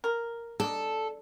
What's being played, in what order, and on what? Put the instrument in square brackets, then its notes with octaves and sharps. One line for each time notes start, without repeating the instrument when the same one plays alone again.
[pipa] A#4
[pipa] D4 D#4 [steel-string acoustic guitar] A4